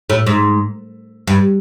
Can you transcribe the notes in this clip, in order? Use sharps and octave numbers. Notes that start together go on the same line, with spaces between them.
A2
G#2
G2